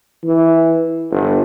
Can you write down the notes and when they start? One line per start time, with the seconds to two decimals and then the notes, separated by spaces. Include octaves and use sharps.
0.23 E3
1.11 G1